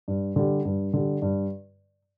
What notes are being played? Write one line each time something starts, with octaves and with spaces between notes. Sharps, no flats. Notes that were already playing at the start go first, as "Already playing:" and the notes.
G2
D3 G3
G2
D3 G3
G2